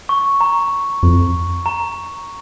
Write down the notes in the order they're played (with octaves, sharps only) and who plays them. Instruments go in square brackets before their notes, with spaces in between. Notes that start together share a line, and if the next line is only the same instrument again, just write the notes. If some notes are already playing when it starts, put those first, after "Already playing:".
[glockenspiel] C#6
A#5
[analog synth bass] F2
[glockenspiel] A#5